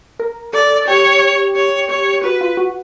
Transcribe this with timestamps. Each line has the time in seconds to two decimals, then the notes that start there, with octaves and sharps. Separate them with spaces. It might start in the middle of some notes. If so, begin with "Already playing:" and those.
0.20 A#4
0.53 A4 D5
0.88 G4 C#5
1.56 C#5
1.90 C#5
2.24 F#4 B4
2.41 F4
2.57 F#4